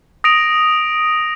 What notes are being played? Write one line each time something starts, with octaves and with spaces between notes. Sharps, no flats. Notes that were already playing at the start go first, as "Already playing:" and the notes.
D#6 A#6 D7 F7